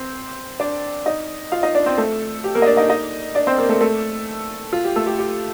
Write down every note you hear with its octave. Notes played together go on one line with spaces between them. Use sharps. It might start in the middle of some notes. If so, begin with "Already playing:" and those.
Already playing: C4 C5
D4 D5
D#4 D#5
F4 F5
D#4 D#5
D4 D5
C4 C5
A3 A4
G4
A#3 A#4
D#5
D4 D5
D#4 D#5
D#4 D#5
D4 D5
C4 C5
A#3 A#4
A3 A4
A3 A4
F4
G4
A3 A4
G4
G4